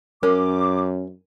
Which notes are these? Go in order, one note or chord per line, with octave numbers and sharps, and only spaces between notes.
F#2 C#4 A#4 D6